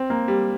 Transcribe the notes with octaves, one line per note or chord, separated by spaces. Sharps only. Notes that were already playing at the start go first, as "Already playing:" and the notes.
Already playing: C4
A#3
G3